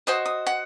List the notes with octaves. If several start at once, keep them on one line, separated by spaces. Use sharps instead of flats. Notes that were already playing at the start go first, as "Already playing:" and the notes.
F#4 C5 D#5 D#6
D#6
F#5